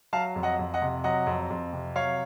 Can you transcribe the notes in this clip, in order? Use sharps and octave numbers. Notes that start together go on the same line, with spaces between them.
F#3 F5 A5
F2
D#5 F#5
F2
D#5 F#5
C3
F#3 D#5 F#5
F2
F2
C3
F#3 C#5 F5